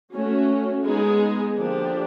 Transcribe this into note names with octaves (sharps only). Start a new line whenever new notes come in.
A3 C#4 F#4
G#3 B3 D#4 G#4
D3 F3 A#3 D4 G4